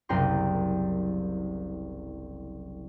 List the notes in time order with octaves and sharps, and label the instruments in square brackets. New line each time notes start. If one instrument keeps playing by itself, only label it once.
[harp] F#1 C2 A#4 G5 C6